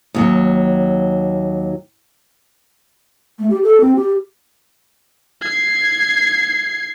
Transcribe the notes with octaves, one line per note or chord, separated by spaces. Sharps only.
D#2 F#3
A3
G4
A4
C4
G4
G#6 C7